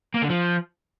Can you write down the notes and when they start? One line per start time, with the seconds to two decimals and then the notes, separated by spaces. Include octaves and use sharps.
0.14 A#3
0.22 D3
0.30 F3